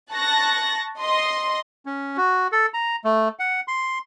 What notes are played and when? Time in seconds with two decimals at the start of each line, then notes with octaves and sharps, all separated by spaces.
0.13 A5 C#6 F#6 A6 A#6
1.01 D#5 C6
1.86 C#4
2.17 F#4
2.52 A4
2.74 A#5
3.04 A3
3.39 F#5
3.68 C6